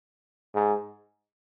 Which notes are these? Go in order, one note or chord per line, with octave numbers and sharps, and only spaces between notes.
G#2